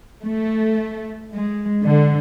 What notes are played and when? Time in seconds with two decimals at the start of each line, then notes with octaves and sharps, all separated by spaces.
0.22 A3
1.33 G#3
1.84 D3